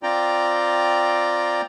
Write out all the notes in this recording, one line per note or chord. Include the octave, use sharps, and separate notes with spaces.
C4 F4 D5 G5 A#5